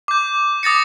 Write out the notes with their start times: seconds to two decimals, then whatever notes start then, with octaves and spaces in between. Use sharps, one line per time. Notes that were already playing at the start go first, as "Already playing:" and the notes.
0.08 D6 G6
0.63 D6 D#6 A6 A#6 C#7